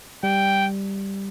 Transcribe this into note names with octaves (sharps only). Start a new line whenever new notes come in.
G3 G5